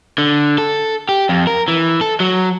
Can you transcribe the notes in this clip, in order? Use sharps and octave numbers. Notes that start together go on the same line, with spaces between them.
D3
A4
G4
F2
A#4
E3
A4
F#3